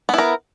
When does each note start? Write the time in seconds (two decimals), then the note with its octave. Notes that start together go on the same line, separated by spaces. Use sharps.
0.09 B3
0.14 E4
0.18 A#4